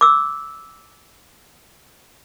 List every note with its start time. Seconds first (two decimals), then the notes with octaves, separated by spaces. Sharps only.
0.01 D6 E6